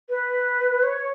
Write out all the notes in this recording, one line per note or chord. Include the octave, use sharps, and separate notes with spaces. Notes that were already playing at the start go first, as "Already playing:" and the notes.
B4
C#5